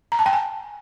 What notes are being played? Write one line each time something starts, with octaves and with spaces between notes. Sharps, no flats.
A#5
A5
G5
G#5